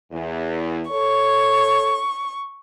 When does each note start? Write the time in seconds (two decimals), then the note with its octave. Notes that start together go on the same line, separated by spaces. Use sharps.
0.11 E2
0.91 A4 C#5 C#6